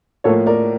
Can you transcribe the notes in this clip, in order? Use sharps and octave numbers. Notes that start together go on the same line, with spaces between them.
A2 F3 A#3 A4 C#5
A#4 D5